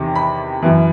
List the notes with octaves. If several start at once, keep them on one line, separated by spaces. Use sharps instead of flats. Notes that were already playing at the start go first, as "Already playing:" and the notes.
Already playing: E2 C3 D#3
B5
F#2 E3